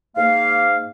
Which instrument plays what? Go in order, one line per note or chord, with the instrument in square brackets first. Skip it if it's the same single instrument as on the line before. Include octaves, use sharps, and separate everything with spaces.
[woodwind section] G#2 A#3 F5